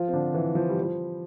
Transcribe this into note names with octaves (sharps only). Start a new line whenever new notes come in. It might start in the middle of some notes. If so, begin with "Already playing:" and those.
Already playing: F3 F4
C4
D3 D4
E3
F3
G3
F3